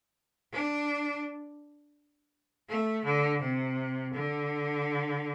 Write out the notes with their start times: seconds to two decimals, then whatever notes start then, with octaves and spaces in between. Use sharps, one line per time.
0.52 D4
2.69 A3
3.05 D3
3.41 C3
4.13 D3